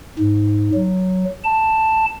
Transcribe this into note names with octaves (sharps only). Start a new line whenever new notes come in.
G#2
F#3
A5